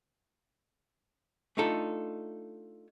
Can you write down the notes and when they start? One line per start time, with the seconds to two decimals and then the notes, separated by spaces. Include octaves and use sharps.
1.57 A3 D4 D#4 F4 A4